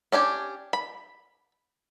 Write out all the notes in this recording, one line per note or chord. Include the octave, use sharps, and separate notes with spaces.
C#4 D4 G4 G#5
B5